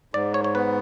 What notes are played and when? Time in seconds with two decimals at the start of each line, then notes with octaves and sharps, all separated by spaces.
0.14 G#2 D5
0.34 C#5
0.44 C#5
0.55 B3 B4